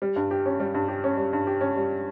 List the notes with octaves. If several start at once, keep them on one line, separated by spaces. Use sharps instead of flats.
G3
G2
G4
C#4
G3
G2
G4
C#4
G3
G2
G4
C#4
G3